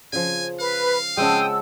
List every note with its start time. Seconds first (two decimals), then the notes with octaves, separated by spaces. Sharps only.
0.13 C#3 F3 G#5
0.60 B4 F5 B5
1.17 C#3 F3 G#3 F#5 G5 A5 D#6 E6